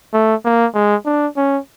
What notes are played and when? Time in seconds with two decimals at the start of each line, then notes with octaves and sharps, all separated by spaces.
0.13 A3
0.45 A#3
0.74 G#3
1.06 D4
1.36 C#4